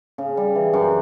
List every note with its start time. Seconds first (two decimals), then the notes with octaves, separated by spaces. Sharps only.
0.18 C#3
0.37 G3
0.55 E3
0.73 F#2